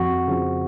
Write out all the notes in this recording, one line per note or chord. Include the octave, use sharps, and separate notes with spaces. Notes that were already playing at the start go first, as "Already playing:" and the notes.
Already playing: F2 F#4
C#3 F3